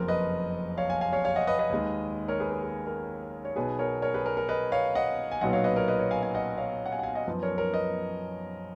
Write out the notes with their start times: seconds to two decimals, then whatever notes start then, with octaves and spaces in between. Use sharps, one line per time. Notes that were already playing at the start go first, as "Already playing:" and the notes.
Already playing: F#1 F2 F3 A#4
0.08 B4 D#5
0.78 C#5 F5
0.90 F5 G#5
1.01 F5 G#5
1.13 C#5 F5
1.25 C#5 F5
1.36 D#5 F#5
1.47 B4 D#5
1.59 B4 D#5
1.70 D#2 D#3 G#3
2.28 A#4 C#5
2.40 G#4 B4
2.52 A#4
2.63 G#4
2.87 A#4
3.45 C#5
3.56 B1 B2 F#3 G#4 B4
3.79 A#4 C#5
4.02 A#4 C#5
4.14 G#4 B4
4.26 A#4
4.37 A#4
4.49 B4 D#5
4.72 C#5 F5
4.95 D#5 F#5
5.32 G#5
5.41 B1 A#2 F#3 B3 D#5 F#5
5.53 C#5 F5
5.64 B4 D#5
5.76 A#4 C#5
5.88 B4 D#5
5.99 C#5 F5
6.11 F5 G#5
6.22 F5 G#5
6.34 D#5 F#5
6.58 C#5 F5
6.86 F#5
6.92 F5 G#5
6.99 F#5
7.03 F5 G#5
7.15 D#5 F#5
7.27 F#2 F3 B3
7.43 A#4 C#5
7.58 A#4 C#5
7.73 B4 D#5